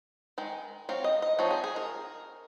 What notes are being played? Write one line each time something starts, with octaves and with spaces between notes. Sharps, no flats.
D#3 G#3
F#3 C4 F5
D#5
D#5
F3 C4 D#4 C#5
G#4
G#4
A#4